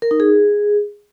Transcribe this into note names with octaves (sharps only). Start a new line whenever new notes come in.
A#4
D#4
G#4